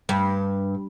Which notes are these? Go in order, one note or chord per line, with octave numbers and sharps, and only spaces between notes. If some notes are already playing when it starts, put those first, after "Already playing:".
G2